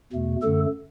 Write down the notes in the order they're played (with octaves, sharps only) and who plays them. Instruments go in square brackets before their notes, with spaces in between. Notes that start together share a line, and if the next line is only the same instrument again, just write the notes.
[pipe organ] E2 B2 A3
F#2 D3 A3 A4